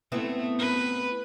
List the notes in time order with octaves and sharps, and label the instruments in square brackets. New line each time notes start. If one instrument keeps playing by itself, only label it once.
[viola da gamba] A3 [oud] B3 C4 E4
[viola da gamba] B4